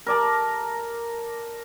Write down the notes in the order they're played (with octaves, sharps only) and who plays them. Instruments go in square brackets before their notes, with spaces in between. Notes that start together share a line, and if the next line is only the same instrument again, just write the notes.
[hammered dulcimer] A#4 D5 A5